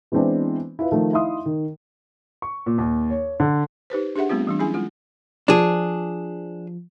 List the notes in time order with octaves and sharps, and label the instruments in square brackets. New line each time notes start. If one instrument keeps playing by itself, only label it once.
[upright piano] E3 G#3 B3 C4 D4 E4
E4 F4 B4
D#3 F3 A3
D#4 E4 E5 F5 C6 D#6
D#3
[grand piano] C#6
A#2
D#2
C#5
D3
[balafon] D#4 G4 B4 C5
D4 G4 G#4 E5 F#5
G3 A3 B3 C4 F4
E3 G3 D4
F#3 C#4 E4 G#4 G#5
G#3 F4
[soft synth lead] F3 [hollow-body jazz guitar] D4 G#4